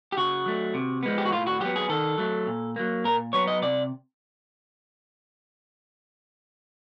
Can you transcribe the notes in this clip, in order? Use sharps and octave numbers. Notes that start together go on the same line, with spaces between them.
G4
C#3 F#4
F#3 A3
C3
F3 G#3 B3
G4
F#4
A2 F4
F#4
F#3 B3 G4
G#4
D#3 A4
F#3 A3
A#2
F#3 A#3
A#2 A#4
F#3 B3 C#5
D#5
C3 D5